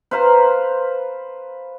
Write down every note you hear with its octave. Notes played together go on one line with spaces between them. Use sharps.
B4 C5 F5 A#5